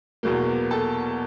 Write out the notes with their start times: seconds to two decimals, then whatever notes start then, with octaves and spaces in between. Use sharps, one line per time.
0.23 E2 B2 F#3 A#3
0.71 A4 A5